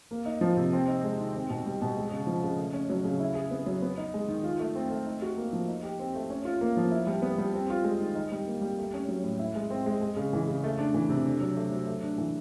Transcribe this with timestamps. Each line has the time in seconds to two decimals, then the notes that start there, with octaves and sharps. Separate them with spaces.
0.11 A#3
0.26 D#4
0.41 F3
0.57 C3
0.73 C4
0.88 D#4
1.04 G#3
1.19 D#3
1.34 C4
1.50 B2
1.66 G3
1.82 B2
1.97 G#3
2.11 C#3
2.27 F3
2.43 C#3
2.58 A3
2.73 C#4
2.90 F#3
3.04 C#3
3.20 E4
3.35 G#4
3.51 B3
3.66 F#3
3.82 B3
3.97 D#4
4.14 G#3
4.28 D#3
4.44 F4
4.60 A3
4.75 C4
4.91 A3
5.06 D#4
5.22 F#4
5.37 A#3
5.53 F3
5.68 D#4
5.83 G4
6.00 C4
6.15 A3
6.30 C#4
6.45 F4
6.61 A#3
6.77 F3
6.91 E4
7.07 G3
7.22 B3
7.38 G3
7.53 C4
7.70 F4
7.84 G#3
8.00 D#3
8.15 D#4
8.32 G3
8.47 A#3
8.62 G3
8.78 A3
8.94 C#4
9.09 F#3
9.24 A2
9.39 E4
9.55 G#3
9.70 C4
9.86 G#3
10.01 G#3
10.16 C#3
10.33 E3
10.47 C#3
10.64 A3
10.78 D4
10.94 E3
11.09 C3
11.25 D4
11.41 F#3
11.57 A3
11.72 F#3
11.87 A3
12.02 D4
12.18 E3